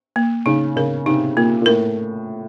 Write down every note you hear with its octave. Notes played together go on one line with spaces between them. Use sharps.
A#3
C#3 D#4
C#3 A#4
C3 D#4
A#2 A#3
A#2
A2 A#4